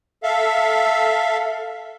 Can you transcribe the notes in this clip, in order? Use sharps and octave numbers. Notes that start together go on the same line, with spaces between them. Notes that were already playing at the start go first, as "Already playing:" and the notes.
A4 E5 F5